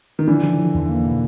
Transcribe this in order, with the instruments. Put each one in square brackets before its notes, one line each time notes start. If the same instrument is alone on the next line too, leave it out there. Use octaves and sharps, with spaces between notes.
[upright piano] D#3
[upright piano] D3 E3 [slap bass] F3
[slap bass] F3
F3
E2
A#3
B2